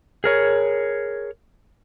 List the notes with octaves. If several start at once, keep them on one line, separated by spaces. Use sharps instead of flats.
G#4 A#4 C#5